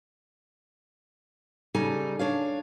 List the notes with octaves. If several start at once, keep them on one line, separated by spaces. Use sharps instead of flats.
C#3 G3 D#4 A4 G#5
D4 C#5 F5